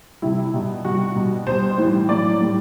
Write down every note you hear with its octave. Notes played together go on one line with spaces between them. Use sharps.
C3 G3 E4
B2 G3
C3 G3 F#4
B2 G3
B2 G3 C5
A2 E3 G3
A2 F#3 D5
A2 G3